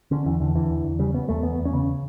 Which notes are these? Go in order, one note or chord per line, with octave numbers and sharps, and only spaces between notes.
D3 C#4
E2 E3
E2 D3
D3 E3
E2
E2
C#3 G3
C#3 B3
E2 A3
E2 B3
E2
C#4
C#3